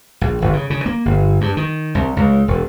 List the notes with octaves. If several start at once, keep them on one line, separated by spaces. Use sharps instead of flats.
A#1
G1
C#3
C#3
A#3
G1
G2
D#3
C2
C#2
E1